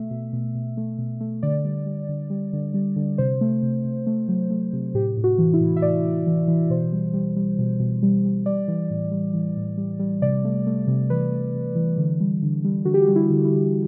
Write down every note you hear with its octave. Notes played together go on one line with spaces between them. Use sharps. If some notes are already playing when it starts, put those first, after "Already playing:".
Already playing: B2 A3 E5
B2
B2
B2
A3
B2
A3
D3 D5
G3
G3
D3
G3
D3
G3
D3
C3 C5
A3
C3
C3
A3
F#3
A3
C3
A2 G4
A2
F#4
E3
E4
A2
E5
A2 D5
A2
E3
E3
B2 C5
G3
G3
G3
B2
B2
G3
G3
G3 D5
E3
A2
G3
E3
A2
G3
G3
C3 D5
A3
A3
C3
E3 B4
A3
C3
E3
D3
G3
D3
G3
D3 F#4
G4
F#4
G3
E4
D3
E4
D3